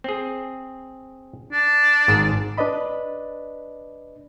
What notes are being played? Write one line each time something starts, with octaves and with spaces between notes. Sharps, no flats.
C4 G#4
D4
G#1 G#2 G#4
D4 B4 D5 D#5 B5